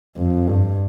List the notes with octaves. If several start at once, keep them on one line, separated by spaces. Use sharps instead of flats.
F2
G2